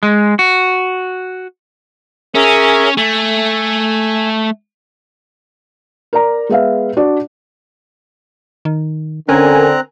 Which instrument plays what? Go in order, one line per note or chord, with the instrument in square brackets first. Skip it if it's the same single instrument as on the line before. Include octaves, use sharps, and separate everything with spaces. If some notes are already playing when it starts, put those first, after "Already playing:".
[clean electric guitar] G#3
F#4
[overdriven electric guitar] C#4 [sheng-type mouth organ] G#4 A#4 E5
[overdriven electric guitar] A3 [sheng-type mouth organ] G#5
[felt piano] A#4 D5 A#5
G#3 B3 E5 F5
D4 F#4 D5
[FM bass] D#3
[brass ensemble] D3 [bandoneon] C4 A#5 F#6 [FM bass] C#4 [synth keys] A#4 G#5